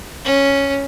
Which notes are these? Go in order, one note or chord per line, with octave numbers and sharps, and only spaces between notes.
C#4